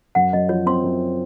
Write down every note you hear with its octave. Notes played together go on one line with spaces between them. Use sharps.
F#2 F#5
F#2 D#5
F3 C#5
C4 C6
F#2